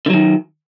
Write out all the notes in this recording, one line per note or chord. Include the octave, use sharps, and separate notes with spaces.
D3 D#3 F#3